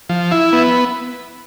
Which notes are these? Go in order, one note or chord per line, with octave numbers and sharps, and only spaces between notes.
F3
E4
B3